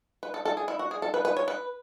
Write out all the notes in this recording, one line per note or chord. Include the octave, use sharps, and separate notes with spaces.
B4
A4
A4
G#4
E4
F#4
G#4
A4
B4
B4
C#5
B4